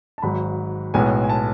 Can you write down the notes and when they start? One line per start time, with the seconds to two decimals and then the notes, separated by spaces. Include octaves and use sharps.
0.18 A5
0.22 G#1 G#2 F#3 B5
0.94 B1 A2 G#3 B3 G#5
1.24 G#5
1.29 A5